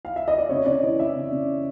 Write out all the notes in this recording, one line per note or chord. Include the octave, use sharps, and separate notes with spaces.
F5
E5
D#5
D5
C#3 C#5
C#3 D5
E3 D#5
E3 E5
C#3
C#3